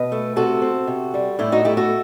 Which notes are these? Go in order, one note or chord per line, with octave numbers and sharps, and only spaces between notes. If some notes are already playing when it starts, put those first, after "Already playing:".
Already playing: B2 B4 D#5
A3
C3 F#4 A4
C4
C3
G3
A2 E4 G4
D#4 F#4
A3 E4 G4
F#4 A4